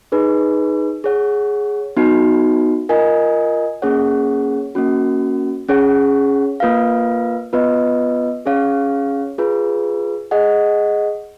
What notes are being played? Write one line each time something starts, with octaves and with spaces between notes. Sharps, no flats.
D#4 G#4 B4
G#4 C#5 F#5
B3 D#4 F#4
F4 A#4 D#5 G#5
A#3 C#4 G#4 C#5 F#5
A#3 C#4 F#4
C#4 G#4 C#5 F#5
A#3 F4 B4 F5
B3 F4 B4 D#5
C#4 G#4 C#5 F5
F4 G#4 B4
G#4 D#5 F#5